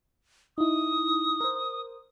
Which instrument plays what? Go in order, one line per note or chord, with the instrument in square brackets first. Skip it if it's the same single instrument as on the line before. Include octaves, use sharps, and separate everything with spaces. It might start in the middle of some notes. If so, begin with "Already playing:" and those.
[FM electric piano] D#4 E4 [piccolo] D#6
[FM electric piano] A#4 C5